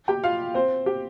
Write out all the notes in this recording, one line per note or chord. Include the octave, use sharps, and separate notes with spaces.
G4 G5
F4 F5
C4 C5
G4